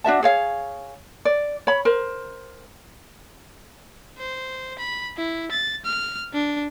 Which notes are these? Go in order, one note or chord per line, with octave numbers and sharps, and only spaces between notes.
D4 F#4 E5 A5
G#4 C#5 F5
D5
C#5 B5
A#4 C5
C5
B5
E4
A6
F6
D4